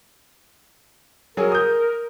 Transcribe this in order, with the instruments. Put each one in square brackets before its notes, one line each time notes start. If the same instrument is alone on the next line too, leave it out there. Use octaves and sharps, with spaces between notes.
[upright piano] F#3 G#4 [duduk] A#4
[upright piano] D#6 G6